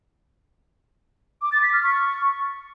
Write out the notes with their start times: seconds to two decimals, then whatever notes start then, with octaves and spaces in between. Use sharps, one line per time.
1.42 D6
1.52 A6
1.63 B6
1.73 F6
1.83 C#6